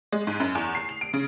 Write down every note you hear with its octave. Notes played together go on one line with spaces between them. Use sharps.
G#3
G#2
F#2
E2
C7
F7
D7
C#3